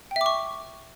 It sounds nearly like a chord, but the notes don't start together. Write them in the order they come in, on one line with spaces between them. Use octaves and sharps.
G5 E5 D6 C#6